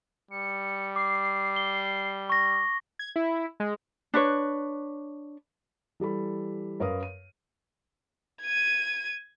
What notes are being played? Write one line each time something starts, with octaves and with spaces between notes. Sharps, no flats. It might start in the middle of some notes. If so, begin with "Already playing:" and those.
G3 C#7
D6 C7
G7
C#6 A#6
G#6
E4
G#3
D4 B4 C#5
E3 G3 A4 B5
F#2 A#4 B4 F5 D#6
D#7
G#6 D#7